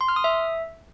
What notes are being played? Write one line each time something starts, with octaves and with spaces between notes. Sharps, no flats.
C6
F6
D#6
E5